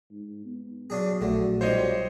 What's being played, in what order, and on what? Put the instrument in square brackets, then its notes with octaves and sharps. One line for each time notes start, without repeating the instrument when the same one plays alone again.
[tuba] G#2
B3
[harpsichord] C#3 D4 G#4 [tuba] F#3
[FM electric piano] A#1 A3 F#4 [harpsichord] D3
[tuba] B1 [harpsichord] G3 F4 [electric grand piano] C5 C#5 D#5